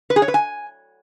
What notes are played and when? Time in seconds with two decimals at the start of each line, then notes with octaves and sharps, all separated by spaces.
0.10 B4
0.16 G#4
0.22 C#5
0.28 B4
0.34 G#5